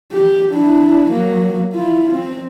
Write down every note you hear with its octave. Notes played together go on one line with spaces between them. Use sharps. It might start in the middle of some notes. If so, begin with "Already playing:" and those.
G4
D4 E4
F#3 A#3
E4 F4
C4